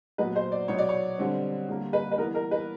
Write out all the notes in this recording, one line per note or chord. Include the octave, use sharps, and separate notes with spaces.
A#2 F#3 B3 B4
C5
D5
B2 F#3 B3 C#5
D5
C#5
D3 G3 C4
D3 G3 A#3
B4
B4
E3 G3 B3 A#4
A#4
B4